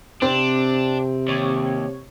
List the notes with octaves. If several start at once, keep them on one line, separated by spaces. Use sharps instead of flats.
C3 C4 D4
D#2 C#5